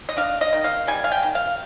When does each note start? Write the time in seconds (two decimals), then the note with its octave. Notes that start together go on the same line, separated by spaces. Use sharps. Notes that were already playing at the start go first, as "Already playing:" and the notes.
0.09 D#5
0.17 D4 F5
0.41 D#5
0.53 D#3
0.64 F5
0.87 G3 G#5
1.04 F5
1.12 G5
1.23 D#3
1.35 F5